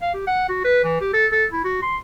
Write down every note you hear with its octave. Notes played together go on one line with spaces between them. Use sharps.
F5
G4
F#5
F#4
B4
E3
G4
A4
A4
E4
F#4
C6